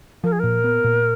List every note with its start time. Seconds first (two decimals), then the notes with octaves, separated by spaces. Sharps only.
0.24 F3 A#4
0.32 G#4
0.39 A#2 A#4
0.64 B3
0.84 A#2